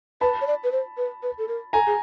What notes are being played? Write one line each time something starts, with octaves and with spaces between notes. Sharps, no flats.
B4 A5 B5
C#5
D5
B4
C5
B4
B4
A4
A#4
A4 G#5 A#5
G#4